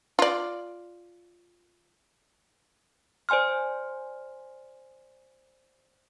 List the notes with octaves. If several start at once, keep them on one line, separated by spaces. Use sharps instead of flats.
F4 D5
C5 D5 G#5 C6 F6